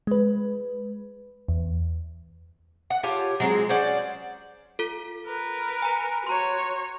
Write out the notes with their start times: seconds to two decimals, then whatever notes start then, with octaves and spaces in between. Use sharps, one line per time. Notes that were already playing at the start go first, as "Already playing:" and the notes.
0.07 G#3 B4
1.48 E2
2.90 F#5
3.03 F4 G4 C#5 A5
3.40 F#3 G#3 C4
3.69 C#4 C5 D5 F#5
4.79 F4 A4
5.26 A#4 B4
5.82 G#5 A#5
6.27 F#4 C#5 A#5 C6